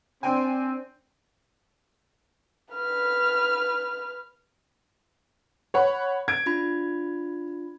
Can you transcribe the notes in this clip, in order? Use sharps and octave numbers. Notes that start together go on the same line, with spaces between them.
C4 D4 G5 G#5
B4 F6
C#5 F#5 B5
G#6 D7
D4 F4 B5